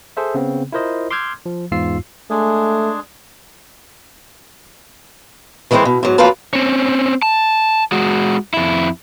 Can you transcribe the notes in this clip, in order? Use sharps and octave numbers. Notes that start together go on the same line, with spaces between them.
G#4 A4 C5 E5
C#3 B3 C4
E4 F4 A#4 C5 D#5
C6 D6 E6 F6 G6 G#6
F3
E2 G#2 F4 E6 C7
G#3 A3 D4 G#4
D#3 E3 G#3 C4 E4 C5
B2
G#2 F#3
F2 F#3 A#3 F4 B4 A5
C4 C#4
A5
G#3 F#4
F2 E4